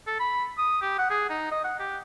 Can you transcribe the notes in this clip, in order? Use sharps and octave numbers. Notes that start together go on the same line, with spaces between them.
A4
B5
D#6
G4
F#5
G#4
D#4
D#5
F#5
G4